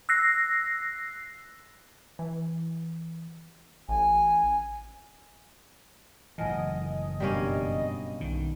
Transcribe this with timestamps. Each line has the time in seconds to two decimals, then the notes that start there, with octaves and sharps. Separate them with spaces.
0.09 E6 F#6 A#6 C7
2.19 E3
3.89 A1 G#5
6.38 F#1 A2 E3 A#4 D#5 F#5 G#5 A5
7.20 G2 B2 G3 A#3 C#4
8.21 B1 D#3